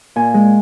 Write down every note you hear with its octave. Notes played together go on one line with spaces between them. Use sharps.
A#2 G#5
G#3